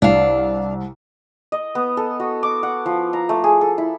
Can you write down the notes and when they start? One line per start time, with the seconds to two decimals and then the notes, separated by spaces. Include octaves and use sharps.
0.02 C2 D4 F5
1.52 D#5
1.75 B3
1.97 A4
2.20 F#4
2.43 D6
2.63 F#5
2.86 F3
3.13 A#5
3.29 A3
3.44 G#4
3.61 A4
3.78 E4